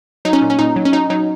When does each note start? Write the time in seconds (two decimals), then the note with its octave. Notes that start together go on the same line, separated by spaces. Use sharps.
0.25 F#3 D#4
0.33 C#4
0.42 A#2
0.50 C#4
0.59 A#2 D#4
0.76 F#3
0.85 C#4
0.93 F#3 D#4
1.10 F#3 D#4